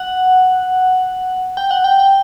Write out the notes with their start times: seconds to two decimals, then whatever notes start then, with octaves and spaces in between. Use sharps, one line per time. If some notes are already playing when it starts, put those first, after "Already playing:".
Already playing: F#5
1.57 G5
1.71 F#5
1.84 G5
1.99 G5